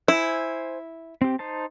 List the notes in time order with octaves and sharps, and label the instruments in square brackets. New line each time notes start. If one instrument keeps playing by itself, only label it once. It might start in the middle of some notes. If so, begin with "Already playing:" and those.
[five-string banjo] E4 [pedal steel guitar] C5 G#5
[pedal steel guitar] C4 G4
D#4 C5 A5